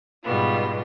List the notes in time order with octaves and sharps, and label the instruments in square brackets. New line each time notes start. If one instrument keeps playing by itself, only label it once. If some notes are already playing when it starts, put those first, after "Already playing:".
[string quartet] G#2 B2 G3 B3 F4